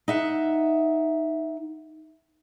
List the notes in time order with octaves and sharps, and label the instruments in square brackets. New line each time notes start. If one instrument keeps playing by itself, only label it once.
[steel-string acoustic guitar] D#4 E5 F#5